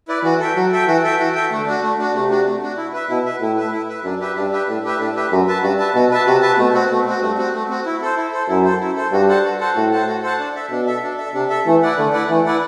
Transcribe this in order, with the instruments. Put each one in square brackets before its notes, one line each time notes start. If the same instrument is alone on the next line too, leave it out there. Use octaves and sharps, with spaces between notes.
[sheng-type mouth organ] E4 B4 D5
[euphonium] E3 [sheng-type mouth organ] F#4
[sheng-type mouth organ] A4 E5 G5
[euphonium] F#3 [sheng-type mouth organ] F#4
[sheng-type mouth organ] A4 E5 G5
[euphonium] E3 [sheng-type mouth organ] F#4
[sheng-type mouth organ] A4 E5 G5
[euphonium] E3 [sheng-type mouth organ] F#4
[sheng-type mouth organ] A4 E5 G5
[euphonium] D3 [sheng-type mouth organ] A3
[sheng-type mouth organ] D4 F#4
A3
D4 F#4
[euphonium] C3 [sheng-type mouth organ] A3
[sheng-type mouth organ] D4 F#4
A3
D4 F#4
E4
B4 E5
[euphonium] B2 [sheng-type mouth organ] E4
[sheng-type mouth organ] B4 E5
[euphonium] A2 [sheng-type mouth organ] E4
[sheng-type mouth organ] B4 E5
E4
B4 E5
[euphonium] F#2 [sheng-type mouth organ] D4
[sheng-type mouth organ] G4 B4 E5
[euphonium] G2 [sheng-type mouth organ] D4
[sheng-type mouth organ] G4 B4 E5
[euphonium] A2 [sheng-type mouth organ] D4
[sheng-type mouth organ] G4 B4 E5
[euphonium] A2 [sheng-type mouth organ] D4
[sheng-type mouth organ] G4 B4 E5
[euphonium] F#2 [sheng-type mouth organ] F#4
[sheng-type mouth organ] B4 E5 A5
[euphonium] G2 [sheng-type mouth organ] F#4
[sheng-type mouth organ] B4 E5 A5
[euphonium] B2 [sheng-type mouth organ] F#4
[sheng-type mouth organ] B4 E5 A5
[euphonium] C3 [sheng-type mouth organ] F#4
[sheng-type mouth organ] B4 E5 A5
[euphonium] B2 [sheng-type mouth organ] A3
[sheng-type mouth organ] C4 F#4
[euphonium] B2 [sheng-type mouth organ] A3
[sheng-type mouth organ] C4 F#4
[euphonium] G2 [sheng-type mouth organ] A3
[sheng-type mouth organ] C4 F#4
A3
C4 F#4
E4
A4 C5
E4
A4 C5
[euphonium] F#2 [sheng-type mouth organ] E4
[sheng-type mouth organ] A4 C5
E4
A4 C5
[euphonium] G2 [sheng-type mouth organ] F#4
[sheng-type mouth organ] A4 C5 F#5 A5
F#4
A4 C5 F#5 A5
[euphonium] A2 [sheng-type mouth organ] F#4
[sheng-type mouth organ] A4 C5 F#5 A5
F#4
A4 C5 F#5 A5
D4
A4 E5
[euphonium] B2 [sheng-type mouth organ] D4
[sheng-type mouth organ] A4 E5
D4
A4 E5
[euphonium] C3 [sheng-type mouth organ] D4
[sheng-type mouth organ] A4 E5
[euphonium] E3 [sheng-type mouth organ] A3
[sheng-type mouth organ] E4 B4 D5 F#5
[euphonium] D3 [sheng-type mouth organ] A3
[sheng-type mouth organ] E4 B4 D5 F#5
[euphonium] E3 [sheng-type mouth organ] A3
[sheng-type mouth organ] E4 B4 D5 F#5